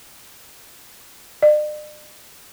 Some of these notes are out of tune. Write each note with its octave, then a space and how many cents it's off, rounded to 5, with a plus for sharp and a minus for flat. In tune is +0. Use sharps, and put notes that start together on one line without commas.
D5 +45